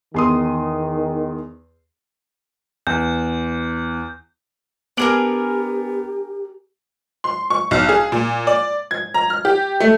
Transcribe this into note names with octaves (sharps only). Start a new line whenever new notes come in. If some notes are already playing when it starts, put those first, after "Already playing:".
E2 D#3 C6 D#6
E2 G6
B3 D4 G4 G#4 A#4 D7 F#7
C6
C#6
B1
G#4
A#2
D5
G#6
A#5
F6
G4
A3